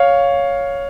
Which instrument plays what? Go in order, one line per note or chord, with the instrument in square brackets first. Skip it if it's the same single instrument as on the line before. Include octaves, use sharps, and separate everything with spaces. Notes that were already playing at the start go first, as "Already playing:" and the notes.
Already playing: [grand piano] C#5 F5